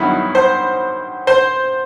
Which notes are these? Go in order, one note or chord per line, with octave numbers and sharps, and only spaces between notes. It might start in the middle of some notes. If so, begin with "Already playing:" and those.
Already playing: G2 D#3 F#3 B3 E4
C5
C5